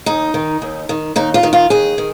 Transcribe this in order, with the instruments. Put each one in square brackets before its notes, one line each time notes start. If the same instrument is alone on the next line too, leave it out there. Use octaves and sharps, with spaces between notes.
[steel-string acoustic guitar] D#2 D#4
D#3
D#2
D#3
D#2 D#4
F4
D#3
F4
D#2 G#4
D#3